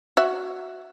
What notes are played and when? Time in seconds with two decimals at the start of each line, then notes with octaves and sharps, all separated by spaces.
0.17 F#4 E5